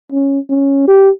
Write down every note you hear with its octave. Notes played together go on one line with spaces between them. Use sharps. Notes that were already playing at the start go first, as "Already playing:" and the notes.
C#4
C#4
G4